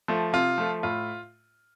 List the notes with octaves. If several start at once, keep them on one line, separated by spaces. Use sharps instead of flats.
F3 A3
C3 F4
F3 A3
A2 F4